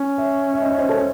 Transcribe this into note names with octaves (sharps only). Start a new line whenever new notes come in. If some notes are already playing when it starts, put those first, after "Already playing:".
Already playing: C#4
C#5 E5
E5
D#5
C#5
C5 D#5
A4 C#5